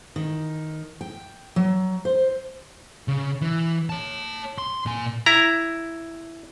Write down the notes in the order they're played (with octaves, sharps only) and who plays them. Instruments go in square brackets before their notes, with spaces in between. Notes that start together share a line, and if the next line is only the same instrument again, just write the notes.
[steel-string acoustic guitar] D#3
G5
F#3
C5
[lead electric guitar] C#3
E3
C#5 A5
C6
A#2 G#5
[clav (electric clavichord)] E4 A#5